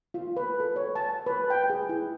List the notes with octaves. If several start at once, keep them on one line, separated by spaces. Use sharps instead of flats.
F4
B4
A4
C#5
A5
B4
G5
G#4
E4